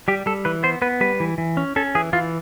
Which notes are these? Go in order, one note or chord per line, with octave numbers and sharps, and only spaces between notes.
G3 G4
G3 A4
E3 B4
B3 C5
B3 B4
G3 B4
E3
E3
C#4
C#4 A4
E3 G#4
E3 F4